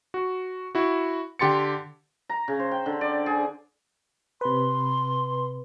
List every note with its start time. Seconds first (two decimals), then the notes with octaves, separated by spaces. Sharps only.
0.14 F#4
0.75 E4 F#4
1.39 D3 G4 C6 A6 C#7
2.29 A#5
2.48 C#3
2.59 C5
2.71 G5
2.86 D3
3.01 D5
3.26 G#4
4.41 C3 B4 C6